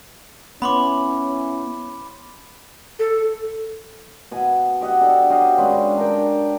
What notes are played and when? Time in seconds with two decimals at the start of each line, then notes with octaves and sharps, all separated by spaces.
0.62 B3 C#4 E4 B5 C6 D6
2.99 A4
4.31 B2 G#5
4.81 G4 D#5 F#5
5.01 D4 A4
5.29 F#3 G4 D#5 F5
5.58 G#3 C#4 D4 B4
5.97 D4 A#4 G5